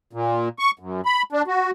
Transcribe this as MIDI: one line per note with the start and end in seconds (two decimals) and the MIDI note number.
0.13 0.49 46
0.59 0.71 85
0.79 1.01 42
1.05 1.23 83
1.32 1.42 62
1.47 1.71 66